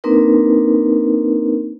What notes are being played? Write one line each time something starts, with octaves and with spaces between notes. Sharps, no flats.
A#3 C4 D4 D#4 A#4 B4